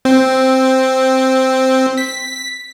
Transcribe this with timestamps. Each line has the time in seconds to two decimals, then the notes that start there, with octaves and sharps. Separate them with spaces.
0.05 C4
1.98 B6